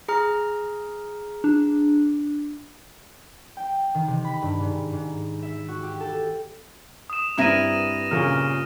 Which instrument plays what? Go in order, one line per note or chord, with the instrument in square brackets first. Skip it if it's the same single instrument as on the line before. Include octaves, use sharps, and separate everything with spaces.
[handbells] G#4 A#5 F6
[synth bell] D4
[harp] G5
D#3
C3
B5
G2
G#2
G#2
E5
F#4
G4
A4
[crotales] D#6 E7
[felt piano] G2 C4 [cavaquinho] E4 A#4 B4 [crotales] D#6 A#6 D#7
[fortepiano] A#2 C#3 A#3 [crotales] F6